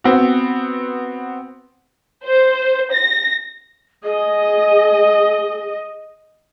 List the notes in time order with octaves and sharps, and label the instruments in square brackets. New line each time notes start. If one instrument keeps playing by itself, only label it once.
[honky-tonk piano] B3 C4 F#4
[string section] C5
A#6
[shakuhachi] G#4 [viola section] D#5